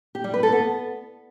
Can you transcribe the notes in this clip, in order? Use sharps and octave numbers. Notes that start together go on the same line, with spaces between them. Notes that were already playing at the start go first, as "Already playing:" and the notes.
G4
G3
B4
A4
B3